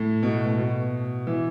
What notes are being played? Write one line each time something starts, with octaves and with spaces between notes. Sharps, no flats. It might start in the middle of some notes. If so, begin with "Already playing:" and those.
Already playing: A2
B2
A2
B2
E3